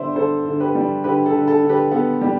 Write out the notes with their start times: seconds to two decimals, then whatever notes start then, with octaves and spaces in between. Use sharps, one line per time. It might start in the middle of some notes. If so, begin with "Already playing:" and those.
Already playing: D3 G3 B3 C5 D5 E5
0.16 D3 A4 C5
0.46 D3
0.60 G4 B4
0.75 G3
1.04 D3 G4 B4
1.26 A4
1.34 D3
1.48 A4
1.62 D3
1.69 G4 B4
1.91 B3 A4
2.21 G3 G4